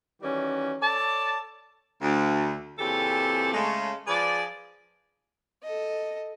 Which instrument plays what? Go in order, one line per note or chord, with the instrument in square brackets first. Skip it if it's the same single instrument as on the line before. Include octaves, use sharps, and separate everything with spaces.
[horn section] D#3 E3 G3 C#4 F#4
A4 C#5 D5 A5
[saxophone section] D2
A#2 C#3 E3 C4 G4 A4
C#3 G#3 A3
F3 G#4 B4 D5
[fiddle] A4 D#5